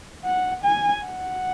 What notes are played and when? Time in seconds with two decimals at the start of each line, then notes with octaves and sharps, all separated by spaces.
0.24 F#5
0.64 G#5
1.05 F#5